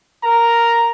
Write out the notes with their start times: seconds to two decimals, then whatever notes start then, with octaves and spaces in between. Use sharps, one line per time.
0.24 A#4 A#5